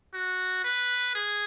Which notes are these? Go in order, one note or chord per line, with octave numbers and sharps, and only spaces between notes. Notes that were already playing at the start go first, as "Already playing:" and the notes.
F#4
B4
G#4